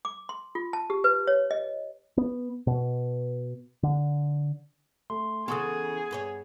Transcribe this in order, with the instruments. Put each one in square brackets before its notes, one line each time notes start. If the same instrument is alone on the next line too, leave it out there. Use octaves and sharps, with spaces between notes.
[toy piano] D6
C6
F4
A5
G4
B4
C#5
D#5
[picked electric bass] B3
B2
D3
[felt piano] A3 [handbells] C6
[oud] C#3 E3 A4 [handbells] B3 [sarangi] G#4 [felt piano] C6 C#6 D#6
[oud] G2 B4 C#5